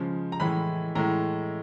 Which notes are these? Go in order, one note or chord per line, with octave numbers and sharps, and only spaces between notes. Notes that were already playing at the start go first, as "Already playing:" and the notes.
Already playing: C#3 F3 G#3
A#5
A2 E3 G#3 B5
A2 E3 G#3 A#5